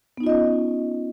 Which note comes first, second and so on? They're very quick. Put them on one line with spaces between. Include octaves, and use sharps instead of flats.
B3 D#4 F4 D#5 C#4